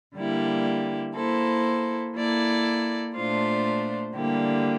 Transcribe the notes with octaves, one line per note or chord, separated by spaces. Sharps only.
D3 G3 A#3 E4 G4
A#3 E4 A4 C5
A#3 E4 A4 D5
A#2 A3 D4 F4 C5
D3 G3 A#3 E4 G4